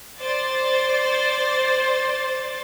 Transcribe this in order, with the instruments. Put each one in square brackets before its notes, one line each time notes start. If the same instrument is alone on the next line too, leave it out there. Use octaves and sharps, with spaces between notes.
[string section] C5 D5 A6